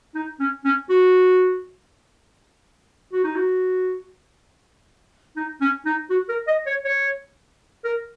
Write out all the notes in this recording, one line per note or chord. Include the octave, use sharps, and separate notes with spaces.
D#4
C#4
C#4
F#4
F#4
D#4
F#4
D#4
C#4
D#4
F#4
A#4
D#5
C#5
C#5
A#4